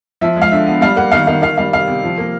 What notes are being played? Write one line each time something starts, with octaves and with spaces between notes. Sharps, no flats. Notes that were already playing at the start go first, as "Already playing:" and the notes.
F3 E5
G#3
F5
D3 E5
B3
G3 F5
A#3 F#5
D#3 F5
D#3 F5
D#3 F5
G3 F5
C3 F5
C3
F3
A#3